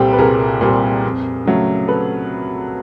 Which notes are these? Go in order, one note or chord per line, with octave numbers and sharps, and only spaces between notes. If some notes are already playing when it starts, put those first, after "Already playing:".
Already playing: C2 A#2 G3 C4 G4 A4
B4
C2 G#4 A#4
A#2 G3 C4
F2
C#3 F#3 A3
A4 B4